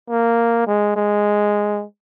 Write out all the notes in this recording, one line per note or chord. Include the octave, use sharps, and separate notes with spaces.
A#3
G#3
G#3